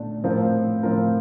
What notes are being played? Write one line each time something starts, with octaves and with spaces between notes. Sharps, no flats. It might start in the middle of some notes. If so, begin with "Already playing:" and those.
Already playing: A#2 A3 D4
A2 F3 C4 F4 A#4
A2 F3 C4 F4 A#4